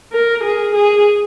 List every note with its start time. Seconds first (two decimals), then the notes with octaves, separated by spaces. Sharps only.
0.12 A#4
0.43 G#4
0.74 G#4